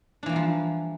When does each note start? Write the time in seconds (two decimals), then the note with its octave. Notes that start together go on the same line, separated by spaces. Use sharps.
0.23 D4
0.26 E3
0.29 A#3
0.32 G3
0.36 F3